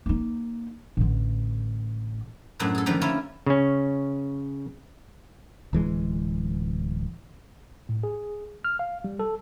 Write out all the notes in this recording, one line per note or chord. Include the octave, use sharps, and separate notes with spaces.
A#3 D#4
A1 D3
F#2 A2 D4 A#4 C5
G#4 A4
D3 D#3 F3 G3 A#3
A#3 C#4 E4 F4
C#3 C#4
D1 E3 G#3
A2
G#4
F6
F5
G3
A4